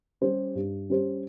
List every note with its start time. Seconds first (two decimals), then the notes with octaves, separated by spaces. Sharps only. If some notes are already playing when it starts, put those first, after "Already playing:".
0.21 G3 C#4 G4 C5
0.55 G2
0.89 G3 C#4 G4 C5